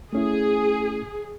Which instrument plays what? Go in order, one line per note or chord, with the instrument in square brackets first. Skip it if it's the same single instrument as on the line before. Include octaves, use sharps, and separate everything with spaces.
[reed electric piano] A3 C#4 E4 [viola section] G#4